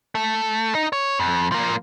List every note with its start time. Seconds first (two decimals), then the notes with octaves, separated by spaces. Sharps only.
0.15 A3
0.75 D#4 D#5
0.93 C#5
1.20 F2
1.52 F3 A#3